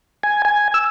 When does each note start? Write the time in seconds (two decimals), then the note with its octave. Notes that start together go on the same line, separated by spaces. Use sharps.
0.23 G#5
0.45 G#5
0.74 E6